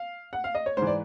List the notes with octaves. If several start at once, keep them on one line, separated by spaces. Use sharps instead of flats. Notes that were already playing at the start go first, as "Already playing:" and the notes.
Already playing: F5
F#5
F5
D#5
C#5
G#2 E3 C5
D5